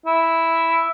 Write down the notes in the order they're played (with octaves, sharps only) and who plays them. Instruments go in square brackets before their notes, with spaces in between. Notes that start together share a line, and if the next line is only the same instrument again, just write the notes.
[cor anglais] E4